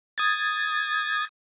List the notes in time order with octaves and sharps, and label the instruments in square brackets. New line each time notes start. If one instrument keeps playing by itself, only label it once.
[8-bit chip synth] D#6 G#6 A6